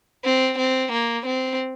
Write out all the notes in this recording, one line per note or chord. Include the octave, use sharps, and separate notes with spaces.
C4
C4
A#3
C4